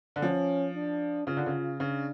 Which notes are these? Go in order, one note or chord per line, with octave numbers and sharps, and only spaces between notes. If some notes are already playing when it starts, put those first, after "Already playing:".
D3
F3 C#4
D4
C#3 F4
D3
C#3
C#3 D4